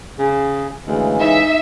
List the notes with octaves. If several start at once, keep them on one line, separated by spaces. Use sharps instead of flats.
C#3 G#4
D2 C#3 E3 G#3
D#4 E5